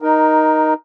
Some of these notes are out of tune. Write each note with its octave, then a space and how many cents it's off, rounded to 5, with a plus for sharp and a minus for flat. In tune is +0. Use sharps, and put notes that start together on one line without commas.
D#4 +0 A#4 +15